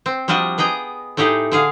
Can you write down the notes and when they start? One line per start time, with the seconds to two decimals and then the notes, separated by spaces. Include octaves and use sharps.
0.06 C4
0.28 F3 G3 D4 F#4 D#5
0.58 B3 G#4 D#5 G5 A#5
1.17 A2 A3 D#4 G4 G#4
1.52 D3 G#4 F5